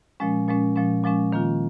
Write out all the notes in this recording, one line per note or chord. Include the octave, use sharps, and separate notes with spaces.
A#2 F3 G#3 C#4
A#2 F3 G#3 C#4
A#2 F3 G#3 C#4
A#2 F3 G#3 C#4
D#3 A#3 F4